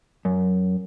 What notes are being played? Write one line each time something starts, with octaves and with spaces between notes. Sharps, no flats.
F#2